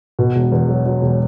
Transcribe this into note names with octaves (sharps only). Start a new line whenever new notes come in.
B2
E1
E2
F#3
F#3
E1